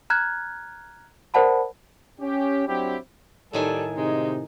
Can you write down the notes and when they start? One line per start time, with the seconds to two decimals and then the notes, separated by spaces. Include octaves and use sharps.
0.10 A#5 F6 F#6 G#6
1.34 A#4 C5 D5 F#5 A5 B5
2.20 C#4 G4
2.67 F#3 C4 D4 E4 G4
3.53 A2 D#3 G3 A4 G#5
3.97 C3 G#3 D#4